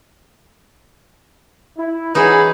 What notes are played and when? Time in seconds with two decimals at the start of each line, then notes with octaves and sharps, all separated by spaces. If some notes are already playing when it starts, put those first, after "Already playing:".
1.76 E4
2.14 E3 C#4 D#4 F#4 G#4 B4